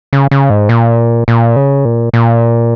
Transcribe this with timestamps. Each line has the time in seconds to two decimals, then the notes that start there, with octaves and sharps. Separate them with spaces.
0.13 C#3
0.31 C#3
0.50 G#2
0.69 A#2
1.28 A#2
1.56 C#3
1.85 A#2
2.13 A#2